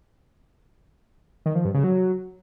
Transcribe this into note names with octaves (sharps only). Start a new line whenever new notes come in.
D#3
F3
G2
C#3
F#3